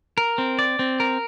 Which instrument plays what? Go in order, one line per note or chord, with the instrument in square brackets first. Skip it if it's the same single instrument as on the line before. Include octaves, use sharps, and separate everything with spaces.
[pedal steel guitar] A#4
C4
D5
C4
A#4